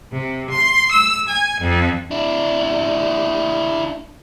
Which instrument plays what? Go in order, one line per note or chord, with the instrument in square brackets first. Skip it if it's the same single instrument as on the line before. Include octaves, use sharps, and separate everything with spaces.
[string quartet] C3
C6
E6
G#5
F2
[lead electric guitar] D4 E4